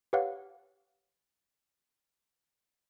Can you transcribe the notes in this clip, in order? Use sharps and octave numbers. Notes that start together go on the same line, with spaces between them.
G4 B4 C#5 F5 F#5